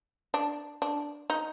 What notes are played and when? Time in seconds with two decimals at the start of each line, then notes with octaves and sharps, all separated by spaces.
0.34 D4
0.82 D4
1.30 D#4